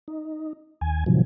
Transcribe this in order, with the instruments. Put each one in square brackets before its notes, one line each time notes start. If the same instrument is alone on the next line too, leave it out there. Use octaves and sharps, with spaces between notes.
[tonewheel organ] D#4
D#2 G#5
A2 C3 D#3 F3 F#3